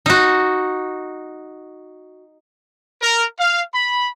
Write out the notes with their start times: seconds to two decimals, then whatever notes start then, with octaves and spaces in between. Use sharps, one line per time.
0.06 D#4 F#4
3.02 A#4
3.39 F5
3.74 B5